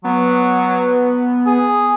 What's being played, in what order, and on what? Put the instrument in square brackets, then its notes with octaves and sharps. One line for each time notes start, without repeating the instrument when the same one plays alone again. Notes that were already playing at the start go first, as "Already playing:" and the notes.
[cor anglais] F#3 [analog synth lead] B3
[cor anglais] G#4